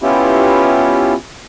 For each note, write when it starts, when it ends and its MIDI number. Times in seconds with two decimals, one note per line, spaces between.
0.03 1.14 59
0.03 1.14 61
0.03 1.14 64
0.03 1.14 65
0.03 1.14 67